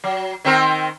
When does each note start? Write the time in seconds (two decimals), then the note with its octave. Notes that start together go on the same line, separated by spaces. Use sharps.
0.04 F#3
0.45 D#3 C4 A#4